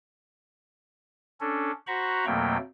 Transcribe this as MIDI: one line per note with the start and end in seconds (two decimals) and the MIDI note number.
1.40 1.71 61
1.40 1.71 62
1.40 1.71 69
1.87 2.25 66
1.87 2.25 72
1.87 2.25 78
1.87 2.25 82
1.87 2.25 83
1.87 2.25 85
2.26 2.57 41
2.26 2.57 47
2.26 2.57 54
2.26 2.57 57
2.26 2.57 58
2.26 2.57 79